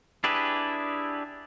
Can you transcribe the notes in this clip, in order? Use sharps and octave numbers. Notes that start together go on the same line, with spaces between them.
D4 E4 G4 G#4 B4